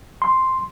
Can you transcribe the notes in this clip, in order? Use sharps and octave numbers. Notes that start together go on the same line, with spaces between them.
C6